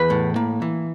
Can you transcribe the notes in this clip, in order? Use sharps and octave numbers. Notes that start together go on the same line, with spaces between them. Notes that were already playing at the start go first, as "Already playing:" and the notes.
Already playing: E2 B4
A2
A#3
E3